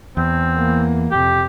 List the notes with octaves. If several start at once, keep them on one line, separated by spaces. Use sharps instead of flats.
E2 C4
E3 A#3
F2 C3 G4